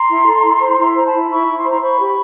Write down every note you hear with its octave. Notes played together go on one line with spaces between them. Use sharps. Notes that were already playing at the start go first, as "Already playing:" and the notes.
Already playing: A#5 C6
E4
A4
E4
C5
E4 A#5 C6
C5 A#5
A5 B5
E4
E4 B5 C#6
E4
C6
C5 B5
A#5 C6
C5 B5 C#6
G4
B5 C#6